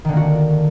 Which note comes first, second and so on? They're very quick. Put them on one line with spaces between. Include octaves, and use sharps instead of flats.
D#3 D3 A#3 F#4